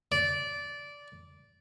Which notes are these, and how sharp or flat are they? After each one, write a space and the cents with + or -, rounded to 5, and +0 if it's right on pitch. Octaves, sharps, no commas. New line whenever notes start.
D5 -15